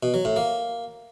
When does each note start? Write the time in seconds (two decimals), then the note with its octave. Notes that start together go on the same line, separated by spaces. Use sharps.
0.03 B2
0.14 F#3
0.25 A2
0.36 A#3